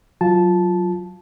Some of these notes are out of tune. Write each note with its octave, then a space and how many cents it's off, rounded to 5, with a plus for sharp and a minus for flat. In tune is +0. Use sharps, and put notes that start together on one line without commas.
F#3 +0 F4 +0 A5 -10